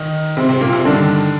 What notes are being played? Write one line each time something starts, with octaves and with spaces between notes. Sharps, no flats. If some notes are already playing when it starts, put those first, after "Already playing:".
Already playing: D#3 D#4
C3 C4
C3 C4
A#2 A#3
C3 C4
G2 D3 D#3 D4